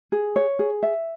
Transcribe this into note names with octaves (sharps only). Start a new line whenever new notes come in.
G#4
C#5
G#4
E5